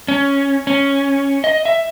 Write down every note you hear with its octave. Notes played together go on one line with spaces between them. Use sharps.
C#4
C#4
D#5
E5